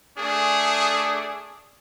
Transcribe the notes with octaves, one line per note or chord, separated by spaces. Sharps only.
A3 D4 G#4